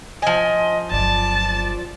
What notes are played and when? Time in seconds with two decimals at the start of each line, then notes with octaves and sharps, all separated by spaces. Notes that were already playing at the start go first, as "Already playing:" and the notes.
0.22 F3 D#5 G#5
0.91 G1 F#3 D5 A5